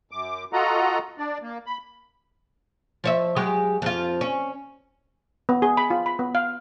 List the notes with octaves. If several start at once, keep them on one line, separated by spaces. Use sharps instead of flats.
F#2 D6
F4 F#4 A4 D#5 F#5 A#5
D4 D5
A#3
B5
F3 C#5 E5
F#3 G#3 G4
F2 F4
C#4
B3
G#4
B5
F4
B5
B3
F5